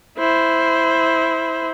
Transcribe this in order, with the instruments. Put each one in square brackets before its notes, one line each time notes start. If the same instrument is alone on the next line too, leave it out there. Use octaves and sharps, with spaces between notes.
[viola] E4 C5